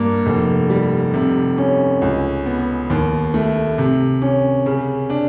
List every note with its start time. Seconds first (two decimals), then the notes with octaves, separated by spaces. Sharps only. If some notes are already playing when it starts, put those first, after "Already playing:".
Already playing: G2 A#3
0.26 F1
0.70 G3
1.14 C3
1.58 C#4
2.02 C#2
2.46 B3
2.90 D#2
3.34 A3
3.78 C3
4.22 C#4
4.66 C#3
5.10 D4